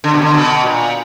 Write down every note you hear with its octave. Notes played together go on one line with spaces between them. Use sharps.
D3
B2
D3
B2
A#2